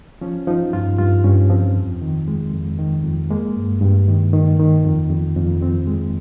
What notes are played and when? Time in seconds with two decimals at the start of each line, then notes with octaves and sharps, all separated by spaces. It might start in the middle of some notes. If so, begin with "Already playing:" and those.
0.21 F3 C#4
0.47 F3 D#4
0.73 G2 F4
0.98 G2 F4
1.24 G2 C#4
1.50 F3 C4
1.76 F2
2.02 D#3
2.28 G#3
2.53 F2
2.79 D#3
3.04 F2
3.30 G#3 A#3
3.56 G2
3.81 G2
4.08 D#3
4.33 D#3
4.60 D#3
4.85 F2
5.10 F2
5.37 F2
5.61 F2 C4
5.87 G#3